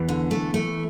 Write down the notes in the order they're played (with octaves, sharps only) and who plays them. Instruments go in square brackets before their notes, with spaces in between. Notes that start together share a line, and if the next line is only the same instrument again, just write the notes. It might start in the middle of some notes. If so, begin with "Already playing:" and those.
Already playing: [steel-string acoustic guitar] E2 [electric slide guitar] E3
[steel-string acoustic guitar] D3
A3
A3